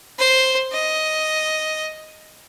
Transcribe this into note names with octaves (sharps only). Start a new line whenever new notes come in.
C5
D#5